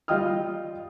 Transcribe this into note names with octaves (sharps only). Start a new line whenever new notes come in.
G3 F4 D#5 G5 D#6 F6